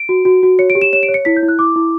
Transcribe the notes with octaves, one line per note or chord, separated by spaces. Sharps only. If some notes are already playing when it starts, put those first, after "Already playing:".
Already playing: D7
F#4
F#4
F#4
C#5 C#7
D7
G4
E7
C#5 E7
D7
C#5
C#7
E4 B6
G6
E4
F#6
E4 D6
E4